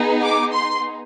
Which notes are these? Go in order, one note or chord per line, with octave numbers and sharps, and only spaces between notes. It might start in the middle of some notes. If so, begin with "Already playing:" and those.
Already playing: B3 D#4 G#4
D6
C6